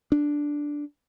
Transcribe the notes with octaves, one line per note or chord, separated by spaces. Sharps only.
D4